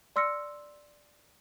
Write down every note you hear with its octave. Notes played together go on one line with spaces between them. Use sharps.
D5 C6 E6 F6 A#6 C#7